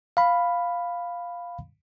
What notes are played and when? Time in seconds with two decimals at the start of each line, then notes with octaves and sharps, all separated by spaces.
0.17 F5 B5